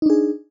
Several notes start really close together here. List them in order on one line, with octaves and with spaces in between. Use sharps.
D#4 D4 G#4